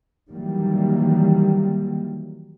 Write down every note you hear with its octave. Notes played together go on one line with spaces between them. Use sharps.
D#3 E3 F#3 G3 A#3